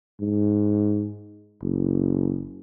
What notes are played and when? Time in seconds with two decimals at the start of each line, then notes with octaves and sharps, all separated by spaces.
0.21 G#2
1.62 F#1